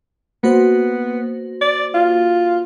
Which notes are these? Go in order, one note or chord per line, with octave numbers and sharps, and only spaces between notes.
A#3 B3 F#4 C5
D5
F4